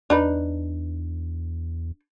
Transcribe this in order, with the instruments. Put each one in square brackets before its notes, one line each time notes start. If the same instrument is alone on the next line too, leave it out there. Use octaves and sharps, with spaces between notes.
[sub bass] E2 [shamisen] D4 D#4 B4